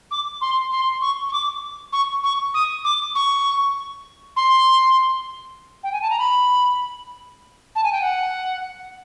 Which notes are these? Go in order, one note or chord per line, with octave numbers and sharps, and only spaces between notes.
D6
C6
C6
C#6
C#6
D6
C#6
C#6
D#6
D6
C#6
C6
G5
G#5
A5
A#5
B5
A5
G#5
G5
F#5